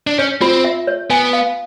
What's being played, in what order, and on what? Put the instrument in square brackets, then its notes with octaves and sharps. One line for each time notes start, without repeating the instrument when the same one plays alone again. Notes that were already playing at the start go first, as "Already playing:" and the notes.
[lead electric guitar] D4
[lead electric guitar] C#4 [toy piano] C#5
[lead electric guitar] C4 [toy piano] F4
[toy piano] E5
C#5
[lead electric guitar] B3 [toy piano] G#5
[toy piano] F5